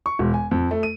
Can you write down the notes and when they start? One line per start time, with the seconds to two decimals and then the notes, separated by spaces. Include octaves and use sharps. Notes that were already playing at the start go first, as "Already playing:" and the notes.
0.06 C#6
0.19 E1
0.34 G#5
0.51 F2
0.71 A3
0.83 D#7